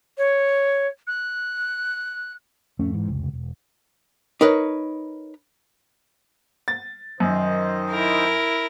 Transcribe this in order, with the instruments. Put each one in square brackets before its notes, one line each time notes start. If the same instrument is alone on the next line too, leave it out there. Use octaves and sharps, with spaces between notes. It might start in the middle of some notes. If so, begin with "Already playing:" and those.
[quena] C#5
F#6
[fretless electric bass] D1 F2 A3 C#4
G#2 E3
F1 C#2
E1
[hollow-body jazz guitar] D#4 A#4 B4 C#5
[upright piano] A6
[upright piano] F#2 [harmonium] D#3 C5 D#5
[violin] E4 A#4